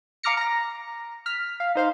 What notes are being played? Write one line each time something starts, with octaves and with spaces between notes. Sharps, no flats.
F5 A#5 D6 F6 A#6 C#7
A#5 A#6
F6 B6
F5
D#4 C5 F5